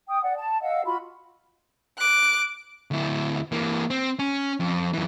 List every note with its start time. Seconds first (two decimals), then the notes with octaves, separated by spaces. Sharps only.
0.09 G5 D#6
0.23 D5 F#5
0.37 A5
0.62 D#5 F5 F#5 E6
0.85 F4 F#4 B5
1.99 D6 F#6
2.91 D2 E4
3.52 E3 A#3
3.90 C4
4.19 C#4
4.60 F2
4.94 F#2 E3